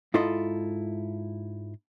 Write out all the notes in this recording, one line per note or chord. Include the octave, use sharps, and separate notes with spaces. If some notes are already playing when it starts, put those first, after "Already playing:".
G#2 E4 F4 A4 D#5 C6